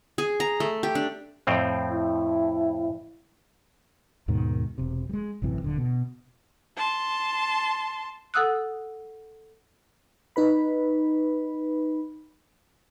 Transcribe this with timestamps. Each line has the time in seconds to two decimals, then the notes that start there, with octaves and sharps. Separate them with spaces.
0.18 G#4
0.40 A#5
0.60 A3
0.83 G4
0.95 D4
1.47 F2 A2 C4
1.92 E4
4.28 D#2 G#2 B2 D#3
4.78 E1 C3
5.09 G3 G#3
5.42 A1 F#2 C3 E3
5.62 D#1 D3
5.78 B2
6.77 A5 C6
8.34 A4 F#5 D#6 E6 F#6
10.36 D#4 B4 B5